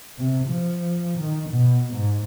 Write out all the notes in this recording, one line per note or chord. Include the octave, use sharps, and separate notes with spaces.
C3
F3
D#3
B2
G#2